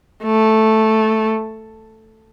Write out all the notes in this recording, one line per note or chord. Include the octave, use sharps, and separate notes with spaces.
A3